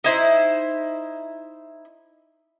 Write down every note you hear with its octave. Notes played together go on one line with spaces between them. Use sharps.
D#4 E4 C5